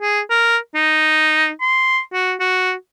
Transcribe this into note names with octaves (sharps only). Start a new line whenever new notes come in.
G#4
A#4
D#4
C6
F#4
F#4